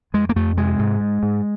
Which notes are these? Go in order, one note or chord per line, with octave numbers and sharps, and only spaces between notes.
F2 G#3
A#3
F2 A3
C3 G#3
G#2
G#2
G#2